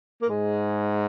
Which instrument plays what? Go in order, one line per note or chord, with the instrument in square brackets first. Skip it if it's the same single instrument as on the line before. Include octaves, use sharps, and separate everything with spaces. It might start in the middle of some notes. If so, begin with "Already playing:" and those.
[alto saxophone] A#3
[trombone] G#2 [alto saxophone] G#3